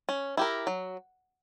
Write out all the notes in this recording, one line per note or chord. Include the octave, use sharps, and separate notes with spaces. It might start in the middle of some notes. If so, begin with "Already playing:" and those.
C#4
E4 G4 A#4
F#3